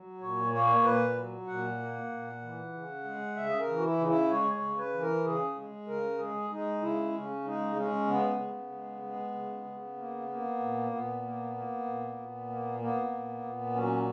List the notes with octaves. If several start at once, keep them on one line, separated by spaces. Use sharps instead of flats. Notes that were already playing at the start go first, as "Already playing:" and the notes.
Already playing: F#3
A#2 C#5
A#3 C#5
A#2 B4
F#3
A#2 F#5
A#3
A#2
E3
C#3
G#3
C#3 E5
G#4
A#4
E3
F#4
E4
C#3 D#4
E4
G#3 C#5
C#5
C#3
B4
E3
A#4
C#3 G#4
G#3
C#3 A#4
G#3 G#4
G#3 D#4
C#3 E4
C#3 C#4
G#3 D#4
G#3 C#4
C#3 B3
C#3
G#3
G#3
C#3
C#3
A#3
A#3
A#2
A#2 B3
A#3
A#3
A#2
A#2
A#3
A#3 B3
A#2
A#2
F#3 C#4